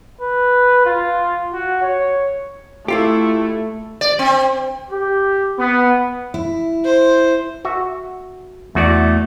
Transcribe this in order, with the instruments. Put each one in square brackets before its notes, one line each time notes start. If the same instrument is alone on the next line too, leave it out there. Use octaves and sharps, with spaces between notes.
[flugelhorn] B4
F4
F#4
C#5
[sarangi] A3 [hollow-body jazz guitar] E4 F4 G4
[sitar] D5
C4
[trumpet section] G4
B3
[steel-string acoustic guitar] E4
[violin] C5
[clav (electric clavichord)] F#4 E5
[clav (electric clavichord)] E2 F#4 D5 [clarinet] A3